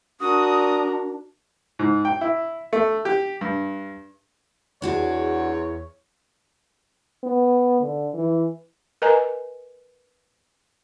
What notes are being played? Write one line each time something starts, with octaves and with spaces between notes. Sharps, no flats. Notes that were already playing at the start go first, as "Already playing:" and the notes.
D4 F#4 A#4 D#6
G#2
G5
E4
A3
G4
G2
E2 D4 F#4 G#4 C#5
B3
D3
E3
A#4 B4 D#5 G#5 A#5